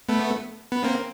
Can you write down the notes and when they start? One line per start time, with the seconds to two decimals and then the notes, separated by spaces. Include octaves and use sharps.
0.09 A3 B3
0.72 B3
0.84 A#3 C4